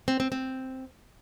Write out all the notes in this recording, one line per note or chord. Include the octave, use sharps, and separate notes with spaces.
C4
C4
C4